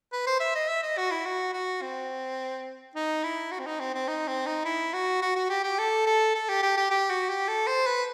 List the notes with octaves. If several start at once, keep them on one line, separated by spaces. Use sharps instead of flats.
B4
C5
E5
D#5
E5
D#5
F#4
E4
F#4
F#4
C4
D#4
E4
F#4
C4
D#4
C4
C4
D#4
C4
D#4
E4
F#4
F#4
F#4
G4
G4
A4
A4
A4
G4
G4
G4
G4
F#4
G4
A4
C5
B4